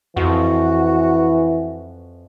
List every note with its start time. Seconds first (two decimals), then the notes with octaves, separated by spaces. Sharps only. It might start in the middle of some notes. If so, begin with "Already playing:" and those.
0.17 F2 E3 F#4